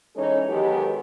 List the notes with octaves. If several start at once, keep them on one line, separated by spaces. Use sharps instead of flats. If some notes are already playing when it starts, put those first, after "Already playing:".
E3 G#3 C#4 D#4 A4 C#5
D#3 F#3 G#3 B3 G4 A4